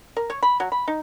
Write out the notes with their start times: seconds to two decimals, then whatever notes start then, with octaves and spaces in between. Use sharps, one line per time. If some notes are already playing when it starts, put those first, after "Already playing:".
0.17 A#4
0.30 C#5
0.43 B5
0.60 F#3
0.72 B5
0.88 D#4